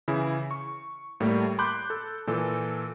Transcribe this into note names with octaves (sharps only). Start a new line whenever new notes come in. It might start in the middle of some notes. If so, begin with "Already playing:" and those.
C#3 E3 E4
C#6
A2 G3 A3 A#3
B5 C6 D6 F#6 G6
A4
A#2 E3 A4